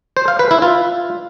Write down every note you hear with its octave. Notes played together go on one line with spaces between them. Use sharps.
C5
F5
B4
E4
F4